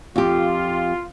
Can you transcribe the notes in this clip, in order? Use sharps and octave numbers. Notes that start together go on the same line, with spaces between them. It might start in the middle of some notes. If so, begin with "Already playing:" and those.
F2 F4 G4